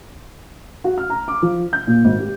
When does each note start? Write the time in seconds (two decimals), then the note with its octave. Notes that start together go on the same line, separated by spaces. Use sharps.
0.84 F#4
0.98 F6
1.10 A#5
1.28 D6
1.42 F3
1.73 G6
1.87 A#2
2.04 G#1
2.20 G4